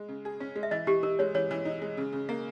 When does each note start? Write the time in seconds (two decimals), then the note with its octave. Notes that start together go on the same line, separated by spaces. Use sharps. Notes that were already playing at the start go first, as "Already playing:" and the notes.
Already playing: G#3
0.08 C#3
0.25 G#4
0.40 C#4
0.56 G#3
0.63 E5
0.71 E3 D#5
0.87 E3 G4
1.03 D#4 A#4
1.19 G#3 C#5
1.35 E3 C#5
1.51 E3
1.65 D#4
1.82 G#3
1.97 C#3
2.12 C#3
2.29 A#3